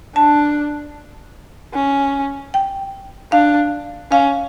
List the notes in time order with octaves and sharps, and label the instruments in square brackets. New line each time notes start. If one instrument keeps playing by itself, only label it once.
[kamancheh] D4 [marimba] A5
[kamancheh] C#4
[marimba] G5
[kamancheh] D4 [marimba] F5
[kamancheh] C#4 [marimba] F5